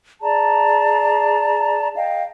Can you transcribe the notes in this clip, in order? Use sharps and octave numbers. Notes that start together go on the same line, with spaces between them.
G#4 D5 A5 A#5
D#5 F5 G5